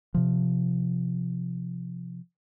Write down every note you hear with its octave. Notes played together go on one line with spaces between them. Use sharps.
C3 F3